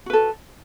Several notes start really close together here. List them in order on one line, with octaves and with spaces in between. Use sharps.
F#4 B4 A4